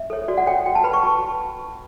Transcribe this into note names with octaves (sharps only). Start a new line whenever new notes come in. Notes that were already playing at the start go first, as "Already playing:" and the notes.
Already playing: E5
A4 C#5
F#4 D5
F#5
A4 C#5 G5
F#4 G5
A5
B4 B5
C#6
F#4 A5